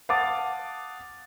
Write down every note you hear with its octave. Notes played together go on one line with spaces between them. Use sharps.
F5 F#5 A5 D6 D#6 A6